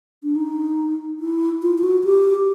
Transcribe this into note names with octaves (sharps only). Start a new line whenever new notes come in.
D4
D#4
E4
F4
F4
F#4
G4